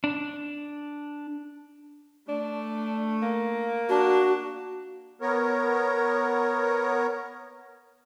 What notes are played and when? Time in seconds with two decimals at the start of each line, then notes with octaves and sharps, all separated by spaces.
0.04 D4
2.29 A3 D4
3.22 A#3
3.89 D4 F#4 A5
5.21 B3 A#4 C#5